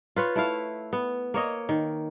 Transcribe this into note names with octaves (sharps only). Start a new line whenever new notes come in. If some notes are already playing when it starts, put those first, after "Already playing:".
F4 B4 C#5
A3 E4 F5
B3
A#3 C#5 D#5
D#3